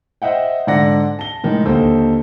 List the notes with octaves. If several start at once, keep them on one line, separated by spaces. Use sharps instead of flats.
C5 D#5 E5 F#5 G5
G#2 D3 D5 F#5 A#6
A5 G7
A2 D#3 G#3
D#2 D3 A4 C5